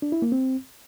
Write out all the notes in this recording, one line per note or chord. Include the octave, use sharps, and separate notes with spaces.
D4
E4
A#3
C4